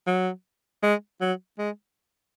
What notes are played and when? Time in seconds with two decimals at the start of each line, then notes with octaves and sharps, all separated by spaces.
0.07 F#3
0.82 G#3
1.21 F#3
1.58 G#3